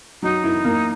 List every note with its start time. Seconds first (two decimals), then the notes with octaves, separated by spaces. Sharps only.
0.22 F#3 D#4
0.44 E4
0.64 A#3